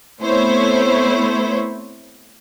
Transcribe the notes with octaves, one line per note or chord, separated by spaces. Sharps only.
A3 B3 C4 E4 C5 C#5